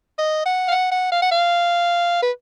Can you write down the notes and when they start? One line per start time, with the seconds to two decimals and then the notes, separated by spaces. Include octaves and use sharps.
0.18 D#5
0.46 F#5
0.68 F5
0.71 F#5
0.92 F#5
1.12 F5
1.22 F#5
1.31 F5
2.22 B4